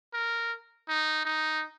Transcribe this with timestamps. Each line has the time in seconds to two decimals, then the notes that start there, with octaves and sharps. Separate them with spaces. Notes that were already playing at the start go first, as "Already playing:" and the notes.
0.14 A#4
0.89 D#4
1.25 D#4